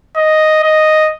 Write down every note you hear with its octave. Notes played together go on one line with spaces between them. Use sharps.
D#5
D#5